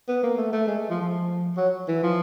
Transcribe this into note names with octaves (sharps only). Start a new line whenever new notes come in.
B3
A#3
A3
A3
G#3
F3
F3
F#3
E3
F3